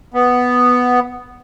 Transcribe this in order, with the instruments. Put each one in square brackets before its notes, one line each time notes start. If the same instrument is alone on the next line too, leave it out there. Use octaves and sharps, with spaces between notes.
[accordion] B3